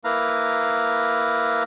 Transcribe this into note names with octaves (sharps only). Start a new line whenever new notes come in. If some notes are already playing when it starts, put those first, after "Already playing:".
A#3 E4 B4 F5 A#5